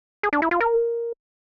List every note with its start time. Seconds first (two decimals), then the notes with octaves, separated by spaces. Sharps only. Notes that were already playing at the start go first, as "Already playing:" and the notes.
0.23 G#4
0.33 D4
0.42 E4
0.51 F4
0.60 A#4